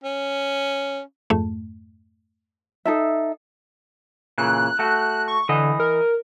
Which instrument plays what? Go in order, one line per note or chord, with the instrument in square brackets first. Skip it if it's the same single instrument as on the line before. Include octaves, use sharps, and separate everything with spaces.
[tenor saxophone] C#4
[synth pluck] F2 G#2 A3
[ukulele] D#4 A4 E5
[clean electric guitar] A#2 C#3 E3 [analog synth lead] F#6
[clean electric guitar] A3 F#4
[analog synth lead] C#6
[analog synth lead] D3 [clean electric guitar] E3 D#5
[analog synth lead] A#4